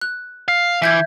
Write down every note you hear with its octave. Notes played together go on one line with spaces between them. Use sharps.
F#6
F5
E3 E5 G6 G#6